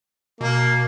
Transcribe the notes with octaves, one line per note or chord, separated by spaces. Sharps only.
B2 A#3